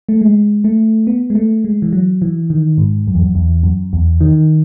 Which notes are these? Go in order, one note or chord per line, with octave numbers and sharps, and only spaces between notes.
A3
G#3
A3
B3
G#3
A3
G#3
E3
F#3
E3
D#3
G#2
F#2
E2
F#2
E2
F#2
E2
D#3